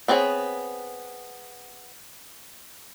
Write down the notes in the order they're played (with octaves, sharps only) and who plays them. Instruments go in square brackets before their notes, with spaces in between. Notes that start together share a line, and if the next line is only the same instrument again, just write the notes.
[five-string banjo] B3 C4 D4 G#4 C#5